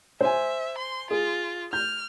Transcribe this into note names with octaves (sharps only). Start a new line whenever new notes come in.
C5 E5 G#5
C6
F4 G#4
F6 G6